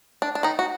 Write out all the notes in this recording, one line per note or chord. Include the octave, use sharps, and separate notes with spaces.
D4
D4
D#3 D#4
F#4